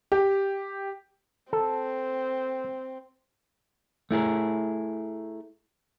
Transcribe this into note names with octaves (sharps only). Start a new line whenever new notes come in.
G4
C4 A4
A3 E4 G#4 A#4